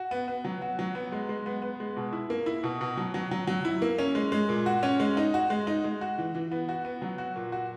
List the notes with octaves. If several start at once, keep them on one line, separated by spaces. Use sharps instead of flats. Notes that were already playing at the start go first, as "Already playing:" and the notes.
Already playing: F#4
B3
B3
F#3
F#4
F#3
B3
G#3
G#3
B3
B3
G#3
B2
E4
A#3
E4
B2
B2
F#3
F#3
F#3
F#3
E4
A#3
C#4
G#3
G#3
A#2
F#4
C#4
G#3
D#4
F#4
G#3
D#4
G#3
F#4
E3
E3
B3
F#4
B3
F#3
F#4
A#2
F#4